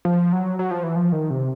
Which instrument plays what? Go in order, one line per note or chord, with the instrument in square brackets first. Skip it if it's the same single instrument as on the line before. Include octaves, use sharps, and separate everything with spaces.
[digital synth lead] F3
F#3
F#3
F3
E3
F3
D#3
C3